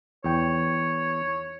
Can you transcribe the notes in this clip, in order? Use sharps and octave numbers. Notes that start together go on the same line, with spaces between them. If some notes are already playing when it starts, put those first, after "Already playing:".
E2 C#5 G5